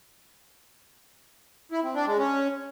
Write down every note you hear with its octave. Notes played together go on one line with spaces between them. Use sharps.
E4
C4
D4
G#3
C#4